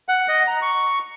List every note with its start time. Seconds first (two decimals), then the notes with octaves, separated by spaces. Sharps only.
0.09 F#5
0.28 D#5
0.47 A#5
0.62 C#6